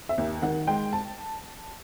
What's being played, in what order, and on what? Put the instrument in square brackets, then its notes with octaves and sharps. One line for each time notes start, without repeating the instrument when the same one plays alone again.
[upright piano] E5
D#2
D#3 F#5
G#3 G5
A5